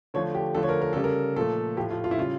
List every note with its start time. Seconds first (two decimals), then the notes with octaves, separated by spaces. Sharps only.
0.14 D3 F3 A3 C#5
0.35 G4
0.55 D3 F3 A3 A4
0.63 C#5
0.69 A#4
0.82 A#4
0.93 C#3 G3 A4
1.04 A#4
1.36 A#2 F3 A3 A4
1.77 A2 F3 A3 G4
1.90 F4
2.04 F4
2.11 E4
2.18 C#3 G3 F4